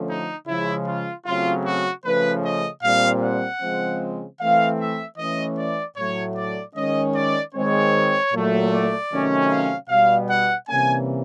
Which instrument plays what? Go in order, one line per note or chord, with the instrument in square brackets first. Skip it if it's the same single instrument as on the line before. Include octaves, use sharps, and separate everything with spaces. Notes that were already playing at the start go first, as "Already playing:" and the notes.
Already playing: [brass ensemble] D3 F3 A3 C#4
D#4
C#3 F3 G#3 E4
F4
C#3 F#3 A3 C4 F4
F#4
C#3 F3 A3 C#4 B4
D#5
A#2 G3 C4 F5
F#5
C#3 F3 G#3 C4
E3 A3 C4 F5
E5
E3 A3 C#4 D#5
D5
A2 F#3 A3 C#5
D5
D#3 G#3 C#4 D#5
D5
D#3 G#3 C4 C#5
A#2 F#3 A3
D5
C3 D#3 F#3 A3 C#4
F5
B2 G3 B3 F5
F#5
C3 E3 G3 A#3 C#4 G#5